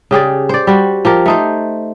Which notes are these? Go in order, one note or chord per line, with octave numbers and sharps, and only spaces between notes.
C#3 G4 G#4 D5
C5 D5
G3 F#4
F3 G4 A#4
A3 D#4 C5